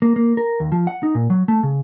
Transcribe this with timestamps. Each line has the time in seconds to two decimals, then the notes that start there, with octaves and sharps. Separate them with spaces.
0.02 A#3
0.16 A#3
0.37 A#4
0.60 D#2
0.72 F3
0.87 F#5
1.03 D#4
1.15 A#2
1.30 F#3
1.48 A3
1.63 C#3